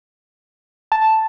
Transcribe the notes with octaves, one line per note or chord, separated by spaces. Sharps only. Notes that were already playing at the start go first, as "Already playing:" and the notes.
A5